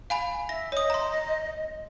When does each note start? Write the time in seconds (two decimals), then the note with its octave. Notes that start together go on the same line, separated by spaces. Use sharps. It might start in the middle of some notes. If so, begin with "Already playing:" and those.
0.10 F5 G#5 B5
0.49 E5 A#6
0.72 C#5 D#5 D#6
0.90 A#5 C6